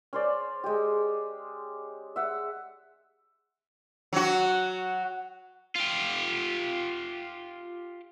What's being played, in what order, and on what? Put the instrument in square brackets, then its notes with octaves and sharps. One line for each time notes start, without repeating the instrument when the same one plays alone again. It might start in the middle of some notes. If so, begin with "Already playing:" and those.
[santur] C#4 C5 D5
G#3 G4
E5 F#5
[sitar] F#3 F#4
[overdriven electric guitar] F4 G4